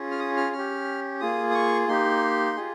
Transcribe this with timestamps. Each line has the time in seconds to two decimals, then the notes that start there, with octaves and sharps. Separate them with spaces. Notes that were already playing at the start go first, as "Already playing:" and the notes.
Already playing: C#4 F4 G#4
0.11 F6
0.19 D#6
0.37 F6
0.53 C#4 F6
0.58 G4
1.20 A#3 F4 G#4 D#6
1.51 D#6
1.54 C#6
1.88 A#3 D#4 G4 C6
2.56 F4 G#4